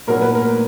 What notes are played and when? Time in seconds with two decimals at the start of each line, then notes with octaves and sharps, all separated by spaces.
0.07 A#2 F#3 B3 A#4
0.21 B4
0.35 A#4